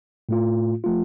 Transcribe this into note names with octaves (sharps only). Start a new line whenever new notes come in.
A2 A3 F4
F3 A3 F4